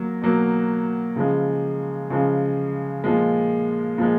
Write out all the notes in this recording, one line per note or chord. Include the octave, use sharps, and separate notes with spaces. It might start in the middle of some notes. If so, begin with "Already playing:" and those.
Already playing: F#3 A#3
B2 F#3 A#3
C#3 F3 G#3
C#3 F3 G#3
A#2 F3 G#3
A#2 F3 G#3